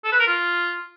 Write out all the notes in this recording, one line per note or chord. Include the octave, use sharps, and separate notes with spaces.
A4
B4
A#4
F4